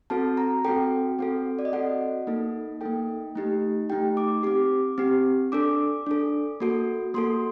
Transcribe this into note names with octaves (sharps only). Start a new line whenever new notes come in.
C4 F#4 A4 A5
A#5
C4 F#4 A4 G5
C4 F#4 A4
D5
D#5
C4 F#4 A4 F#5
A#3 D#4 A4
A#3 D#4 A4 G5
A3 D#4 G4
A3 D#4 G4 G5
D6
C4 G4 D6
C4 G4
D4 A4 D6
D4 A4
A#3 F#4 A4
A#3 F#4 A4 C6